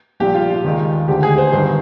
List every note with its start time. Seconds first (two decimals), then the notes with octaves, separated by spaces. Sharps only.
0.20 A#1 A#2 G3 G4
0.35 F4
0.50 F4
0.64 D#2 D#3 G#3
1.08 D2 D3 G#3 G4
1.23 G#4
1.38 C5
1.53 G1 G2 D#3 C5